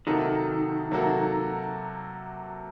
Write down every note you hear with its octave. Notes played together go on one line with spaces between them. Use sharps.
C3 D#3 F#3 A#3 F#4 A4
C3 F#3 A#3 F#4 A4